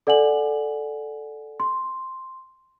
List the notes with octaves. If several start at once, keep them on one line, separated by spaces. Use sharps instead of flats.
A4 D5 F#5 G#5 F#7
C6